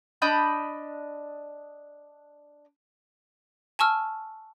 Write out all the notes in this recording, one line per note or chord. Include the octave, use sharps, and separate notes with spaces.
D4 D#5 B5 G6
G#5 A5 C#6 E6 F6